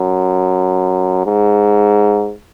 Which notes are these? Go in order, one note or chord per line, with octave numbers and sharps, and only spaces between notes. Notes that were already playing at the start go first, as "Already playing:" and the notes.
Already playing: F#2
G#2